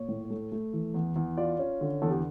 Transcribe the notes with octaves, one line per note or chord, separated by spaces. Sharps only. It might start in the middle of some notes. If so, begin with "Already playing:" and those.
Already playing: A#2 C#5
A2
A3
A3
E3
E2
E2
F4 D5
C#4
D3
E2 A4
G4